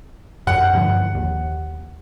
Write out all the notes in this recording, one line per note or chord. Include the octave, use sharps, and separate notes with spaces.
F#2 F#5
G2 D3 F3
D#2